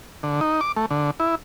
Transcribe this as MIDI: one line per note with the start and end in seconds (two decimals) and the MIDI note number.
0.23 0.40 50
0.41 0.61 63
0.61 0.72 86
0.76 0.86 57
0.90 1.11 50
1.20 1.35 64